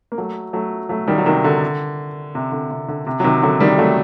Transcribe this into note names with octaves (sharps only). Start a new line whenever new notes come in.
A#3
F#3 A3
F#3 A3
F#3 A3
D#3 G3
F#3
C3 D#3
D3
C3
D3
C3
D3
C3
F#3
C3 D#3
D3 F#3
D#3 G3
F#3 A3